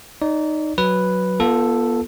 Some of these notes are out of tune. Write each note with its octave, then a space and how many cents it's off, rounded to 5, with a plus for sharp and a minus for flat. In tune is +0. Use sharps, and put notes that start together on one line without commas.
D#4 -10 D5 -30
F#3 +0 B4 +0
B3 -35 F4 -5 A4 +0